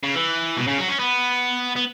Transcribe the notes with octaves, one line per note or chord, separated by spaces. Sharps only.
C#3
E3
B2
C#3
F#3
C#4
B3
B3